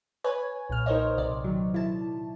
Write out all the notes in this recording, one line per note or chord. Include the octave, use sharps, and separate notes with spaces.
B4 C#5 G#5
B1 A#2 F6
D#4 A#4 C5 C#5 D#5
B1 C3 D5
D#3 F#3
E4 A5